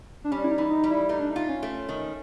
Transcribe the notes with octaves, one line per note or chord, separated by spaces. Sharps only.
D4
G3 C#4
E4
D#4
E3
D#4
G3
E4
A3 D#4
D4
D#4
F4
C#4
A3
D#3